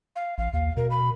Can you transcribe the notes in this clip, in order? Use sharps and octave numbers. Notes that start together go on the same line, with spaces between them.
F5
A1 F5
D#2 F5
B2 A#4
B5